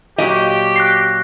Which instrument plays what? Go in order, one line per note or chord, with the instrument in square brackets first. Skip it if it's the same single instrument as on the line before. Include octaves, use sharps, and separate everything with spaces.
[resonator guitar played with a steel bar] A#2 F#3 D#5 [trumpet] G4
[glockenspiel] F#6 A#6 C7